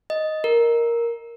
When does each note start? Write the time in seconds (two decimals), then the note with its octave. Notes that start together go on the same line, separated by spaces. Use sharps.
0.10 D#5
0.44 A#4